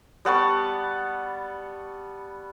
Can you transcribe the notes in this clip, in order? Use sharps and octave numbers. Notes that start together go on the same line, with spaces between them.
G3 B3 A5 C#6